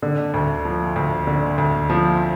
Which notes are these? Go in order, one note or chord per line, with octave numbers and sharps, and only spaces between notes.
D3
D2
F3
D2
D3
D2
F3